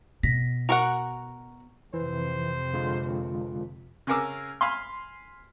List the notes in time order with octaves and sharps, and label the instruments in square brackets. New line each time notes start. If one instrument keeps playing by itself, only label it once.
[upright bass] B2 [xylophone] A#6 B6
[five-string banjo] F#4 A#4 F#5 [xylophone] A#5 C#6
[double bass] F2 C3 [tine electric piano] E3 [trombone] C5
[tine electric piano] D3 G#3 F4
[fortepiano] C#3 C#4 G#4 A#4 D6 E6
F5 G#5 B5 C6